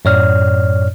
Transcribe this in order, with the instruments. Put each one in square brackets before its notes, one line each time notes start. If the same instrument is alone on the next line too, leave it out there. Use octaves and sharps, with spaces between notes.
[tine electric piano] F#2 A2 C#5 D5 F6